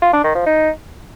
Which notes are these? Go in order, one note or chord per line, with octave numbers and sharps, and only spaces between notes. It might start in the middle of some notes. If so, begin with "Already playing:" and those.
F4
D4
D#3
F3
D#4